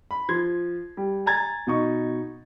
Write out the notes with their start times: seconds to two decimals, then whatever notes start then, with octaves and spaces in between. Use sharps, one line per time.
0.11 B5
0.29 F3 C6 G#6
0.97 G3
1.26 G#5 A#5 G#6 A6
1.67 B2 D#4 C#6